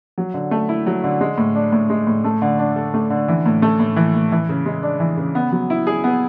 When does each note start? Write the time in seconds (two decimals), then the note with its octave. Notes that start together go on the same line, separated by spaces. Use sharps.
0.18 F#3
0.34 D3
0.51 A3
0.69 E4
0.86 F#3
1.04 D3
1.21 G#3
1.38 A2
1.55 D4
1.72 A2
1.90 G#3
2.07 A2
2.24 A3
2.42 D3
2.59 D4
2.76 A4
2.94 A3
3.10 D3
3.28 E3
3.46 A2
3.62 A3
3.80 A2
3.96 E3
4.14 A2
4.32 E3
4.49 C#3
4.66 G#3
4.83 D4
5.00 E3
5.17 C#3
5.35 B3
5.52 F#3
5.70 E4
5.87 G#4
6.04 B3